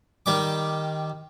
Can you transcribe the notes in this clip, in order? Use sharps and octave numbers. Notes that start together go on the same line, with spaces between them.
D#3 G3 D6